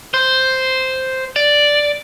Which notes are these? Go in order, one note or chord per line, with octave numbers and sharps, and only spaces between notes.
C5
D5